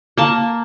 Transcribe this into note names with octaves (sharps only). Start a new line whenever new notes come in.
A#3 A5